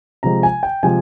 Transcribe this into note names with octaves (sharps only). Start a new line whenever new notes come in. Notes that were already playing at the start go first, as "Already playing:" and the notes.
C3 F3 G#3 A#5
G#5
G5
C3 F3 G#3 G#5